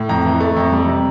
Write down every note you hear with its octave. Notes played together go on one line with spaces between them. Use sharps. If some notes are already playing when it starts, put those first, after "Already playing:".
Already playing: A2
F2 A#5
E3
A3
F2
G3
C3